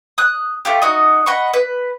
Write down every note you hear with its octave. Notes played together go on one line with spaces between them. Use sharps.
D#6 F#6
A3 F4 G4
D#4 F#4 D#5
D#5 F#5 B5 C#6
B4